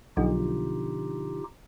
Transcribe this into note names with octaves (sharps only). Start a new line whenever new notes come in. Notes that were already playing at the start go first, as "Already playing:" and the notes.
B1 B2 D3 F3 D#4 F4 G4